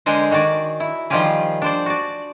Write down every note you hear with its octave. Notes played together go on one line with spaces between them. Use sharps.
D3 G#3 D4 G#4 A#4 C5
D#3 F#4 G#4 D5
E4
D#3 F3 G3 F4 G4 G#4
D4 C5 D5
F#4 D5